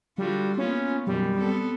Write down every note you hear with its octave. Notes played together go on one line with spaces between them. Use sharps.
D3 G3 F4 F#4
A#3 B3 C#4 F4
F#2 B2 D#3 G3
B3 C4 A4